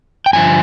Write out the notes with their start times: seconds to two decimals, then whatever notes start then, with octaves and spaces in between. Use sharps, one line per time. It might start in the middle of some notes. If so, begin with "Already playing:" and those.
0.26 G5
0.33 G2 D3 F3 G#5